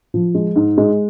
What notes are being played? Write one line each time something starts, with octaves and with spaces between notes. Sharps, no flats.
F3
G#3
G#2
G#3